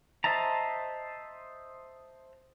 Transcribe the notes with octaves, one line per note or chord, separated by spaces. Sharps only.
C5 D#5 E5 A5 A#5